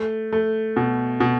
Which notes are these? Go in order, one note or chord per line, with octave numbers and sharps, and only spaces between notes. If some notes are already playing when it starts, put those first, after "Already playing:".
Already playing: A3
A3
B2
B2